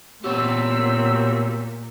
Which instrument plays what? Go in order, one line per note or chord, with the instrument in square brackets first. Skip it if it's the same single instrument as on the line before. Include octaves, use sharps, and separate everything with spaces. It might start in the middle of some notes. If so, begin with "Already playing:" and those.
[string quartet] A#2 [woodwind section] F#3 C4 [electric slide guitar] B3 F#4 G4 [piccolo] E6